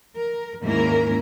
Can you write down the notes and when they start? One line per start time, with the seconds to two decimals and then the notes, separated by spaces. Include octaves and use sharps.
0.15 A#4
0.63 D#2 G#2 A#3 C#4 E4 A#4